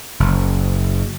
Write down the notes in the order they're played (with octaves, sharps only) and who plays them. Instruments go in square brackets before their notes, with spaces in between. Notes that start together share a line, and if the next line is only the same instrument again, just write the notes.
[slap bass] F#1